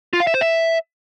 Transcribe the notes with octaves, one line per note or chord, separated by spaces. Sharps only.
F4
F5
E5
C5
E5